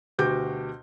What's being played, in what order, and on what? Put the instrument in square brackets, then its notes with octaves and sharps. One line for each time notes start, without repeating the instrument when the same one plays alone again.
[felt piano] D2 B2 F#4 G4 D6 G6